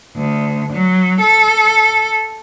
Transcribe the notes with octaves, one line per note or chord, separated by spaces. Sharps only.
D2
F#3
A4